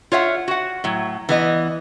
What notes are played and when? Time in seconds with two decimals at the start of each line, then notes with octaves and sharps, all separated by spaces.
0.12 F4 C#5 E5 F#5
0.48 F#4 F#5
0.84 A2 F#3
1.29 E3 B3 D#5